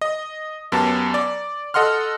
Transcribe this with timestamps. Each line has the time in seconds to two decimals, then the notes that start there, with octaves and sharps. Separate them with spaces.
0.02 D#5
0.72 F#2 B3 G4 A5
1.14 D5
1.74 A4 D#5 F#5 C6 F6